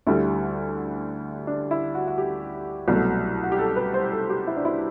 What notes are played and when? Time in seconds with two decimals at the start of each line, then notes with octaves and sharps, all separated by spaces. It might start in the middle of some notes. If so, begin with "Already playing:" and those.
0.07 D2 D3 G3 E4
1.47 D4
1.71 E4
1.95 F#4
2.08 F#4
2.18 G4
2.88 C2 B2 F#3 A3
3.43 F#4
3.52 G4
3.59 A4
3.76 B4
3.94 C5
4.12 A4
4.30 G4
4.47 E4
4.57 D4
4.65 E4